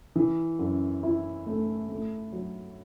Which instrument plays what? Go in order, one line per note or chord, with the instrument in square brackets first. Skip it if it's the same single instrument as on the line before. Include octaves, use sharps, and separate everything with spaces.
[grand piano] E3
F#2
E4
A3
A3
F#3